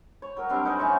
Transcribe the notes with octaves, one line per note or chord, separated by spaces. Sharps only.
C#5
F#3 A#4
F#3 G3 C4 D4
D#4 B4 C5 G#5
A2 E3 C#4 C#6